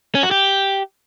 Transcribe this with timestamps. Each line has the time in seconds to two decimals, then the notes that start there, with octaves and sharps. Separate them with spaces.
0.15 C#4
0.23 F#4
0.31 G4